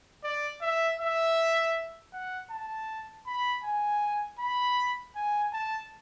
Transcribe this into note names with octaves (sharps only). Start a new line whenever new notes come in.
D5
E5
E5
F#5
A5
B5
G#5
B5
G#5
A5